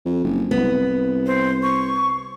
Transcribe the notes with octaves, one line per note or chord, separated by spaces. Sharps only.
F2
F#1
C2 B3
C5
C#6